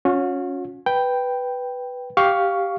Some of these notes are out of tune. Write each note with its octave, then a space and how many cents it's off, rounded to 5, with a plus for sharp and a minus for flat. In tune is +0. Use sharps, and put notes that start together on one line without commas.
C#4 +0 F#4 -45
B4 +0 G5 +0
G4 +0 F5 +5 C#6 +15